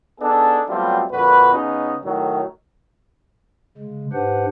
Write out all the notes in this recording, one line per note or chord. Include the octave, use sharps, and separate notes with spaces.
B3 D4 D#4 G#4 A4
F#3 G3 A3 B3 C4 F4
F2 A#2 D3 F#4 B4
C#3 B3 C#4 D#4
A2 D#3 F#3
C#3 G#3
G#2 D4 G4 B4 C5 F#5